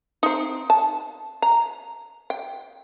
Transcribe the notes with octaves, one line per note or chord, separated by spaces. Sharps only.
C4 D#4
A5
A#5
G5